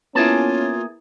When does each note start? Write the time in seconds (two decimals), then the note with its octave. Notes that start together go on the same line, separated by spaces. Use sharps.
0.15 A#3 B3 C#4 E4 F4 G#4 A5